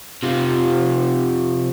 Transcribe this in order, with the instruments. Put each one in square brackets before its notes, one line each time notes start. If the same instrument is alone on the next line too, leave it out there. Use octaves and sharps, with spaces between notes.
[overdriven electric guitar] C3 F3